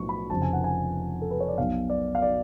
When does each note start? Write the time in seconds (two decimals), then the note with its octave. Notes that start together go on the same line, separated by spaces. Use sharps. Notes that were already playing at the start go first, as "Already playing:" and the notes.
Already playing: B1 A2 F3 C#6
0.09 B5
0.30 F1 F2 C#3 F3 A5
0.42 G#5
0.53 F#5
0.64 G#5
1.22 A4
1.31 B4
1.40 C#5
1.48 D5
1.57 B1 B2 F5
1.90 D5
2.15 F5
2.22 D5